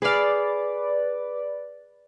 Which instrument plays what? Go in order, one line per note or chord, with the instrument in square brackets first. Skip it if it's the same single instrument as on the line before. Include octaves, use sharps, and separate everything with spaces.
[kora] G#4 F5 [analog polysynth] B4 D5